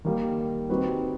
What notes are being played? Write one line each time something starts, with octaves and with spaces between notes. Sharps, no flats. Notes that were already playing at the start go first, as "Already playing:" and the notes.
D#3 G3 A#3
G3 C4 D#4 F#4 B4